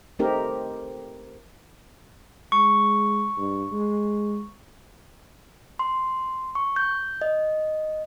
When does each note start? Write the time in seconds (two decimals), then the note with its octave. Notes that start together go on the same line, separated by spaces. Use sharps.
0.19 A3 C4 D#4 G4 A#4
2.52 G#3 C#6
3.37 G2
3.72 G#3
5.79 C6
6.55 C#6
6.76 G6
7.21 D#5